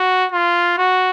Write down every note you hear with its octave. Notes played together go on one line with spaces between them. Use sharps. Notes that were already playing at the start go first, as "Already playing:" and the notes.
Already playing: F#4
F4
F#4